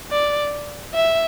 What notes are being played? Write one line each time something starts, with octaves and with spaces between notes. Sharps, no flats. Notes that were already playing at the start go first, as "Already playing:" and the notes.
D5
E5